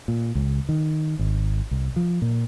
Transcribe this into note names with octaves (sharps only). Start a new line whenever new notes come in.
A#2
C#2
D#3
G#1
C2
F3
A#2